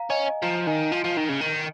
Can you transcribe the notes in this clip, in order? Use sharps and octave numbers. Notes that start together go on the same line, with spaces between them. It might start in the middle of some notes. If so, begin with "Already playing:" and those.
Already playing: F5 A#5
C#4 D#5 G#5
D#5 G#5
F3 F5 A#5
D#3 D#5 G#5
F3
F3
D#3
C#3
D#3